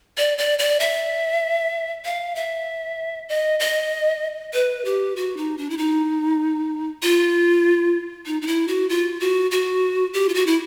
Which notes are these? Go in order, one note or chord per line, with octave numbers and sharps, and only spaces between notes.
D5
D5
D5
E5
F5
E5
D#5
D#5
B4
G4
F#4
D#4
D4
E4
D#4
F4
D#4
D#4
E4
F#4
F4
F#4
F#4
G4
F4
F#4
E4